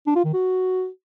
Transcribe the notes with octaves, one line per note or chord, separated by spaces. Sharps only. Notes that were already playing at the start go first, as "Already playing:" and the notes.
D4
F4
D#3
F#4